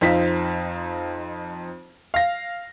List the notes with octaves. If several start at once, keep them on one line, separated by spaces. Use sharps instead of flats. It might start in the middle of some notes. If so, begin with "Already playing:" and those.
F2 C4 D#4 F4 B6
F5 A#6